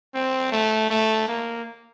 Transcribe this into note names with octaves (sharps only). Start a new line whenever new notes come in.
C4
A3
A3
A#3